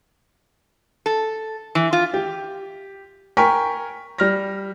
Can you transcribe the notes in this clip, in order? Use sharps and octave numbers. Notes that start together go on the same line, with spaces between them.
A4
E3
F4
G4
A#4 G5 G#5 C#6 B6
G3 F6 A#6